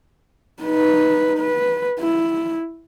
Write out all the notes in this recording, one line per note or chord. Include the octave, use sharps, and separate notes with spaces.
D#4 B4
B4
E4